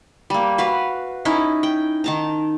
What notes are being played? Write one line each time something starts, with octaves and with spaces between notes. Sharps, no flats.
G3 A#3
F#4 B4 F5
C#4 D#4 E4
G5
D#3 A5 A#5